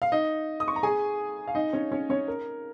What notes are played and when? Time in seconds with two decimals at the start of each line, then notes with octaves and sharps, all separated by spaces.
0.02 F5
0.12 D#4 D#5
0.60 D#6
0.68 C#6
0.76 A#5
0.83 G#4 G#5
1.48 F5
1.55 D#4 D#5
1.73 C#4 C#5
1.92 C#4 C#5
2.10 C#4 C#5
2.28 A#4